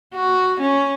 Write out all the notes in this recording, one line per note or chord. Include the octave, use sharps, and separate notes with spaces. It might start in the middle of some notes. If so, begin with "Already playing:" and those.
F#4
C#4